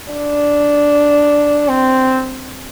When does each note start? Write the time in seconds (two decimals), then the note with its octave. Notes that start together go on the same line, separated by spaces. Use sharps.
0.12 D4
1.68 C4